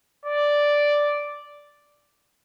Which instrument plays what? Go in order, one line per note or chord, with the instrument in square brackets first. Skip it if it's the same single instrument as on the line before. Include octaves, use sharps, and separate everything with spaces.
[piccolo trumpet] D5